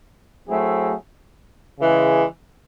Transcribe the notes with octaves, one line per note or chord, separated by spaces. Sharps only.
F#3 A3 C4 E4 G#4
C#3 E3 G#3